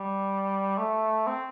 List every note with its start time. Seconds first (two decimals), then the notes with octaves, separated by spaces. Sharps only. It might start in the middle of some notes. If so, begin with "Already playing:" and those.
Already playing: G3
0.78 A3
1.27 C4